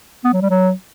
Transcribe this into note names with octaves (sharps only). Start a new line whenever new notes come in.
B3
F#3
G3
F#3